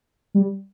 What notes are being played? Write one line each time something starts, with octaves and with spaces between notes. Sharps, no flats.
G3